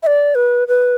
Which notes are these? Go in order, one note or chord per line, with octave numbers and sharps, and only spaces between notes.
E5
D5
B4
B4